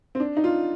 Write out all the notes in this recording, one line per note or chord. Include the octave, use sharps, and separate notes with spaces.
C4
D4
D#4
F4